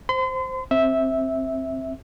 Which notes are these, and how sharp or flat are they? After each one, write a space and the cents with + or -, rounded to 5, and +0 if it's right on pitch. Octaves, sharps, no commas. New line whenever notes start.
C5 +0 C6 -40
C4 +15 E5 -10